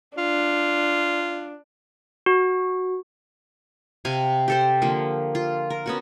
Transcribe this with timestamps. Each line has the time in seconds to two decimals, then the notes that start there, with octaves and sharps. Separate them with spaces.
0.18 D4 F4
2.26 F#4
4.05 C3 F5 G#5
4.48 G4 A4 C5
4.82 D3 F3 A#3
5.35 F4
5.70 A#4
5.86 B3 C#4 F#4